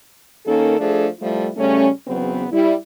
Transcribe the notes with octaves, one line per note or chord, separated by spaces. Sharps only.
D#3 A#3 C#4 D#4 A4
F3 A3 D4 G#4 A4
F3 G3 A3 E4
C#3 G3 A3 C#4
E2 C#3 F#3 B3 C4 B4
G3 E4